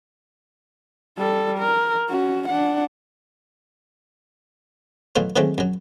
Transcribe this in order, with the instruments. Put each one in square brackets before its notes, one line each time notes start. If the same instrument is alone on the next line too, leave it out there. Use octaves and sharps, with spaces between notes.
[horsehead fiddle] G3 A4
A#4
C#4 F#4
D4 F#5
[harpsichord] B2 E3 F#3 A3 F4
D#3 E3 F#3 G#3 A3 C4
F#2 F#3